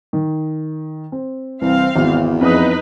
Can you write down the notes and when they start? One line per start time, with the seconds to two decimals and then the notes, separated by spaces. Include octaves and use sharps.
0.13 D#3
1.12 C4
1.61 C2 E3 C4 F5
1.96 G#1 E2
2.41 F2 D#4 G#4 B4 D#6